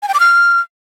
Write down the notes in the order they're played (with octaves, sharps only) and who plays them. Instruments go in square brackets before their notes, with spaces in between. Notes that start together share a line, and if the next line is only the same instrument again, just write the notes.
[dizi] G#5
G5
D6
F6